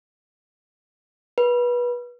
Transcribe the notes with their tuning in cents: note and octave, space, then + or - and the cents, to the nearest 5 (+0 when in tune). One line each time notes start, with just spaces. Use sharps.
B4 -25